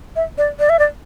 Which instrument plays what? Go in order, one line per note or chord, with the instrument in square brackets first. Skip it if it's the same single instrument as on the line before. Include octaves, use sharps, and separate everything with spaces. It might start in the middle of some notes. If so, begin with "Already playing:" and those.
[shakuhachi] E5
D5
D5
E5
D5